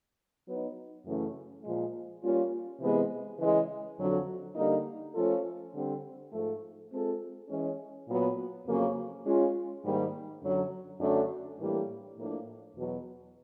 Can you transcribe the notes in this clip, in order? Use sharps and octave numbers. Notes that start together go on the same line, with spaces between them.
F#3 B3 D#4
F#2 C#3 E3 A3 C#4
A#2 F3 G#3
G3 A#3 C#4 F4
C3 E3 G#3 B3
C#3 E3 G#3
F2 D3 F#3
D3 G3 A#3 D#4
F3 A3 C#4 F4 A4
D3 G3 C4
G#2 F3 A3
G#3 C4 F4 A4
E3 G#3 C#4
A#2 F#3 B3
F2 C#3 F#3 A#3 C#4
G#3 C#4 F4
G#2 D#3 G3 A#3
F#2 D3 F#3
F#2 D3 F#3 A3 D4
A2 E3 G3 A#3 D4
A2 F3 A#3 D4
E2 B2 F#3